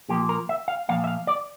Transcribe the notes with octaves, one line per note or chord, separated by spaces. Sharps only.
A#2 F3 A#3 G4
A#4
E5
F5
A#2 F3 A#3 F5
E5
F5
D5